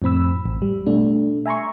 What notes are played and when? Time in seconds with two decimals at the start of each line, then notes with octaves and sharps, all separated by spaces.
0.02 F2 A2 C4 B5 E6
0.46 A1
0.62 G3
0.86 B2 A3 D4
1.46 E5 G#5 A#5 C6 C#6